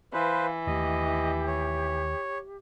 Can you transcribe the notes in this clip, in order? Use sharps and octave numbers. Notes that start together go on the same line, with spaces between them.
E3 B4 C5 F5
D#2 A3 G4 D#5
C#5